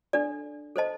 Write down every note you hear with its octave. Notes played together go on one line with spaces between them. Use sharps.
D4 A4 D5
A4 C5 D#5 A5